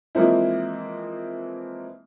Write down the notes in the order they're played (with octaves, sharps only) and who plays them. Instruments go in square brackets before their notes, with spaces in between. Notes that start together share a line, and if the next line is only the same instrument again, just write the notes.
[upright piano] E3 F3 G#3 A#3 C4 E4